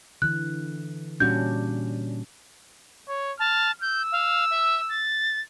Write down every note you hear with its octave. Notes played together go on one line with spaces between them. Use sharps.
D3 E3 F#6
A#2 G3 C#4 D4 F#4 G6
C#5
A5 F6
E6 G6
F5
E5
A6